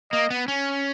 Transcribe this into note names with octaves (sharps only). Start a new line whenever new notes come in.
A#3 D#5
B3
C#4